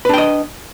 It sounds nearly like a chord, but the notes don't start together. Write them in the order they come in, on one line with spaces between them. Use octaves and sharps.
B4 D4 G5 D#5